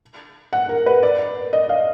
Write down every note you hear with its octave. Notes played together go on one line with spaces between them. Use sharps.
F#5
A#4
B4
D5
D#5
F5